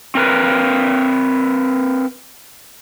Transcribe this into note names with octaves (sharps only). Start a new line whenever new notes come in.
C4 A#4 B4